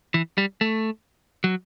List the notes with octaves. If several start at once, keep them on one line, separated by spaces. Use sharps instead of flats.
E3
G3
A3
F#3